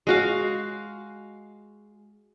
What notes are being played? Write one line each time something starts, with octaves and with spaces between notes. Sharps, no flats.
G#3 F#4 F5